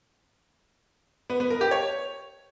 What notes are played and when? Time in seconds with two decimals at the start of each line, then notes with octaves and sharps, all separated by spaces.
1.30 B3
1.40 B3
1.50 A#4
1.61 G4
1.71 C#5